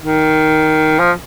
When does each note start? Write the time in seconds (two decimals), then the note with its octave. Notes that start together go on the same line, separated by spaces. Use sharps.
0.03 D#3
0.99 F3